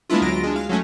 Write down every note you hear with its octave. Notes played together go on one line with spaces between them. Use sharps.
G#3 A#3 B3 D4 E4 F4
D2 F#3 F4 A#6 D7
G#3 D4
F5
F#3 G#3 A3 C#4